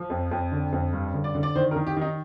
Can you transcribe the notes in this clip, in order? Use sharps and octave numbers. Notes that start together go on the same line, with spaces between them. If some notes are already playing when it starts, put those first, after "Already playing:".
Already playing: F3
F2
F2
D3
F2
G2
D3
D5
D3
D5
D#3 C5
A#4
D#3
G4
D#3 D#4